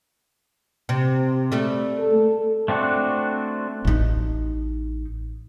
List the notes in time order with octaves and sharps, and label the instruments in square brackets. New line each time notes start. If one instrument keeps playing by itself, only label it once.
[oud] C3
G3 A3
[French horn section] A4
[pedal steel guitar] A3 C4 D4 F#4
[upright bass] A1 D#4